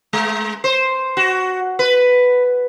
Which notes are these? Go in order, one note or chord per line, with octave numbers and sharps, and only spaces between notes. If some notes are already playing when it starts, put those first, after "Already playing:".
G#3
C5
F#4
B4